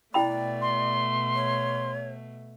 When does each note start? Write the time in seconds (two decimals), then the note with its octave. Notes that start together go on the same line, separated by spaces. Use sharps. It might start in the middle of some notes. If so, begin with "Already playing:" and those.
0.14 B2 A3 E4 D5 G5 B5
0.62 C6
1.34 C#5